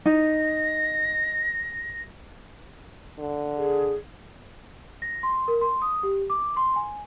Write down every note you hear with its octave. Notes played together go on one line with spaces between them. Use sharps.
D#4 A#6
D3
G#4
A#6
C6
A#4
C6
D#6
G4
D6
C6
G#5